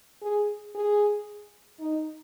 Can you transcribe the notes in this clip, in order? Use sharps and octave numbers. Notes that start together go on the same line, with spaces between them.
G#4
G#4
D#4